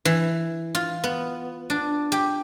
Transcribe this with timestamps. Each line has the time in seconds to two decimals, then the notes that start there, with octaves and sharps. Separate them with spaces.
0.05 E3
0.75 F4
1.04 B3
1.70 D4
2.12 G4